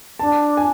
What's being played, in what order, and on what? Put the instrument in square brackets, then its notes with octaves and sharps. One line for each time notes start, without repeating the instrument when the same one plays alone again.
[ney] D4 [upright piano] A5
[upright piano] G#5